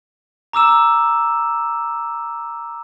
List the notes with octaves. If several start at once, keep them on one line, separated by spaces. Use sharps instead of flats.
A#5 D6 E6 E7